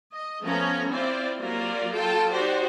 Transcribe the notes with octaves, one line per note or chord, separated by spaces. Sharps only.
D#5
F3 A3 B3 C#4 A#5
C4 E4 F4 C5 D5
F#3 A#3 F4 G4 A#4 D5
F#3 F4 A4 G5 A5
D#4 F#4 G4 C5 D5